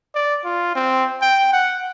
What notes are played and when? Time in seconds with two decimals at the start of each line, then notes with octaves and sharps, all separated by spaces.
0.15 D5
0.45 F4
0.76 C4
1.22 G5
1.53 F#5